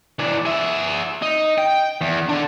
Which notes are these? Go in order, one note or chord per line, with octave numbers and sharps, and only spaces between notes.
E3 D4
G#4 E5
D#4
G5
E2
D3 D4